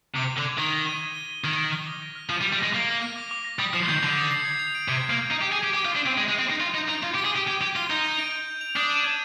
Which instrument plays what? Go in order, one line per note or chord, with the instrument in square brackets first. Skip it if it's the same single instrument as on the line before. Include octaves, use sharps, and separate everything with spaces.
[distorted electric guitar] C3 [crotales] D6
[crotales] D#7
[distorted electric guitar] D3
[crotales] G#6
[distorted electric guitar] D#3 [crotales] G7
[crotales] D6
D#7
G#6
G7
D#7
[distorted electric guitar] D#3 [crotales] G#6
[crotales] G#6
G7
D6
A#6
F6
[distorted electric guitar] F3 [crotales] D#7
[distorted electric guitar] G3
[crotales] D6
[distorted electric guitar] G3
[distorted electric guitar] G#3 [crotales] A#6
[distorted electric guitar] A#3 [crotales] D6
[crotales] A#6
F6
D6
D6
A#6
[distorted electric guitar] G3 [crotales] D#6
[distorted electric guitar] F3 [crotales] C7
[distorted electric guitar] D#3 [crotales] G6
[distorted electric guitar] D3 [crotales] F7
[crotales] D#6
C7
G#6
F7
D7
[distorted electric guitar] C3 [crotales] G#6
[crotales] G#6
[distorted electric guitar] A#3
[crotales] F7
[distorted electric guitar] D#4 [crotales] D#6
[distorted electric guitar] G4
[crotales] D#7
[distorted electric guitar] G#4
[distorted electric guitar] G4 [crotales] G#6
[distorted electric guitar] G4 [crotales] G7
[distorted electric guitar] F4
[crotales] D#6
[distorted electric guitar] D4
[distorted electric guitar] C4 [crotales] D#7
[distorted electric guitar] G#3 [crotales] G6
[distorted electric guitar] G#3
[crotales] D7
[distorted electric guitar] C4
[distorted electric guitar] D#4 [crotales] A#6
[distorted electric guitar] F4 [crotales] F7
[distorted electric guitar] D#4 [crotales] G6
[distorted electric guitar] D#4 [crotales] D7
[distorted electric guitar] F4 [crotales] G#6
[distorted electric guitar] G4
[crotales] G7
[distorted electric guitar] G#4
[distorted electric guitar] G4 [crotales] D#7
[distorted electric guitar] G4 [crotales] G#6
[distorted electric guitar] G4 [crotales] G#6
[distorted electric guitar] F4 [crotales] G7
[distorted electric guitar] D#4 [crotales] G6
[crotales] F7
D7
G6
G6
F7
[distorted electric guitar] D4 [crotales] D#6
[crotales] D#7
G#6